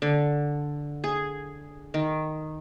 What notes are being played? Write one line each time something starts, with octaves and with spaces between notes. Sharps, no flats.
D3
G#4
D#3